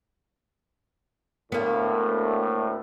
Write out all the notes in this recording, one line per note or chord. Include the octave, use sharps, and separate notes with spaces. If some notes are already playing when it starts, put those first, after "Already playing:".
D2 A2 A#3 B3